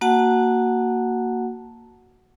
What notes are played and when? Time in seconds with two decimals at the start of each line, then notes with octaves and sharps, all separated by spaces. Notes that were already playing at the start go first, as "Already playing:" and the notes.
0.01 A#3 F#4 F#5 A5